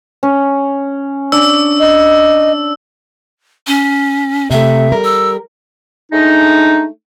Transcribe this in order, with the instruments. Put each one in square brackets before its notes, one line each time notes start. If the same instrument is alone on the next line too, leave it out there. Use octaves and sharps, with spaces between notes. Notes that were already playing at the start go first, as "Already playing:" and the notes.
[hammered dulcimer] C#4
[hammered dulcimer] D4 [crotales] E6
[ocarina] D#5
[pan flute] C#4
[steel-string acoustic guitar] C3 A3 [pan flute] E5
[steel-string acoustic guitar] G3 A#4
[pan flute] E6
[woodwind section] G#3 A3 D4 D#4